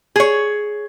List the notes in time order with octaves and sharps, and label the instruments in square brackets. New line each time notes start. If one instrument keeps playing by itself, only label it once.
[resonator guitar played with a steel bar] G#4 C#5